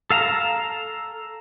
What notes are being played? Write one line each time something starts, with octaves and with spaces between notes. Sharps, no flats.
A4 F5 A5 A#5